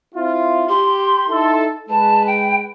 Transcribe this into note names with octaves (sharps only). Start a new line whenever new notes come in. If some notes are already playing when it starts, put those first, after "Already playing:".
C4 E4 F4
G4 C6
D#4 E4 A4
G#3 B4 A5
G5